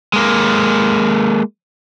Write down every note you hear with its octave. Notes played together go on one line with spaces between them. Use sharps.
G#3 A#3